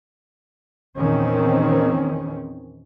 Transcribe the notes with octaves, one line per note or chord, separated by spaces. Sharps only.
E2 A#2 D#3 C4 C#4